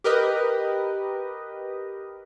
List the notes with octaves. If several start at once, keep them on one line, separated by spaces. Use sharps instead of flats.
G4 A#4 B4 D#5